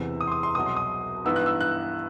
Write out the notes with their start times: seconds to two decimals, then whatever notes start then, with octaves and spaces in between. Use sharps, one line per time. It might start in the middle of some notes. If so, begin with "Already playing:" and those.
Already playing: E1 E2 C3 E3 B3 E6
0.21 D#6
0.28 C6
0.32 D#6
0.43 C6
0.55 C2 B2 F#3 D#6
0.66 C6
0.77 D#6
1.25 G2 E3 B3 D#4 E6
1.36 F#6
1.46 E6
1.61 F#6